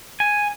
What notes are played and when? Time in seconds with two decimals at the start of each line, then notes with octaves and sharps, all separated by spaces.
0.20 G#5